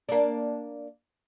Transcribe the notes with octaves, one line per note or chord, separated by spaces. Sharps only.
A#3 D4